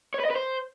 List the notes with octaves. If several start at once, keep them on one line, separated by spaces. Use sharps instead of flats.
C#5
B4
D#5
B4
C5